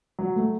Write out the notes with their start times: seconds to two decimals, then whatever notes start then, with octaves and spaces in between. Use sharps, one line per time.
0.19 F#3
0.36 A3